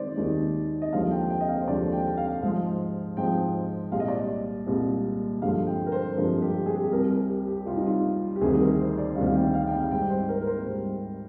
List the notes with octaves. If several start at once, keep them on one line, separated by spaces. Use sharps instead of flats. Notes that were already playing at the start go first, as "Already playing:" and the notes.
Already playing: D#3 G#3 C5 D5
D#2 D#3 G#3
D#5
D#2 D3 F3 G#3 F5
G5
G5
D#5
F5
C5
D#2 D3 F3 G#3 D5
G5
F5
G#2 F3 G#3 F5
G#2 F3 G#3 G5
C2 A#2 G#3 F5
D#5
D5
D#5
C2 A#2 G#3
G2 D3 F3 G#3 F5
G5
A#4
C5
G2 D3 F3 G#3 A#4
G4
G#4
G4
G#4
C2 C3 G3 A#4
A#4
G4
G4
C2 C3 G3 F4
D#4
F4
G4
D2 C3 D#3 G3 G#4
G#4
A#4
C5
D5
D2 C3 D#3 G3 F5
F5
G5
F5
G5
F5
G#2 G3 G5
C5
A#4
A#4
C5
G#2 G3